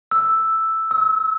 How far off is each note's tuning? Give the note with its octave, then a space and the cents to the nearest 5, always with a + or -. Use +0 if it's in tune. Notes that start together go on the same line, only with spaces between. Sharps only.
E6 +0
E6 -35